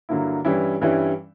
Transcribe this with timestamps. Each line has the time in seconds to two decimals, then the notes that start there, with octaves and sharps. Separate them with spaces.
0.09 G2 D3 F#3 A#3 E4
0.45 G2 E3 G3 C#4 E4
0.81 G2 E3 G3 C#4 E4